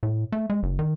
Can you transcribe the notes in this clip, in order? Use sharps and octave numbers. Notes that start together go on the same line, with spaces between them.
A2
A3
G#3
F#1
D#3